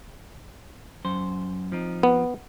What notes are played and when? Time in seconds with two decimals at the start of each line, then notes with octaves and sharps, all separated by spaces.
1.05 F#2 C5
1.72 F3 C4 D#4
2.03 B3